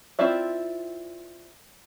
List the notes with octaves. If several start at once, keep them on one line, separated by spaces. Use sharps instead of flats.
C4 E4 F4 D5 E5